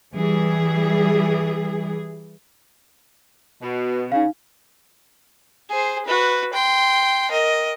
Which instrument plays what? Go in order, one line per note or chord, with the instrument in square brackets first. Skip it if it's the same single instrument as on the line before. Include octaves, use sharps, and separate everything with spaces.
[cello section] E3 G3 G#4
[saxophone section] B2
[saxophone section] C#3 [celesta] D#4 F5
[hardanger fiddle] G#4 C5
F#4 B4
G5 C6
A#4 D#5